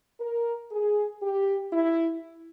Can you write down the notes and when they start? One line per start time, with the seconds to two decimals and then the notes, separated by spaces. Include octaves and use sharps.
0.21 A#4
0.71 G#4
1.23 G4
1.73 E4